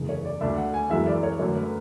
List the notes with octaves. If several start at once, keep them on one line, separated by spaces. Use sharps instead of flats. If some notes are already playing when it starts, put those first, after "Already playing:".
Already playing: F#1 E2 D3 G#3
C#5
D5
D2 D3 A3 D4 E5
F#5
G#5
F#2 E3 G#3 B3 E5
D5
C#5
F#2 D3 A3 C#5
B4